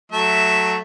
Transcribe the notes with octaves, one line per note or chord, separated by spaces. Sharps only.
F#3 A3 E5